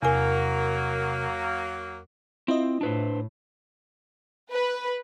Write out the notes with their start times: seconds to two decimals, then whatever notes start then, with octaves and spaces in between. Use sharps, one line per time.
0.03 E2 C3 F#3 A#3 A#4 G#5
2.48 C4 E4 F4 D#5
2.81 A2 D4 B4 C5
4.51 B4